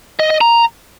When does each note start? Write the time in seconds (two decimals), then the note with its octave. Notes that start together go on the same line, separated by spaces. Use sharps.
0.20 D#5
0.30 D#5
0.41 A#5